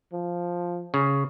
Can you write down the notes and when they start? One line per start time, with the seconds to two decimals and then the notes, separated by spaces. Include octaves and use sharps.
0.13 F3
0.94 C#3